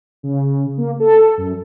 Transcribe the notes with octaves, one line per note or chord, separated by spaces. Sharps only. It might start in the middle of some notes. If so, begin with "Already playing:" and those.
C#3
A#3
A4
F#2